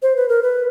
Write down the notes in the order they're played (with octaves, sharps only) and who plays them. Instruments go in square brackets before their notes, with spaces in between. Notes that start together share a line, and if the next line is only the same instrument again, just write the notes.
[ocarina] C5
B4
A#4
B4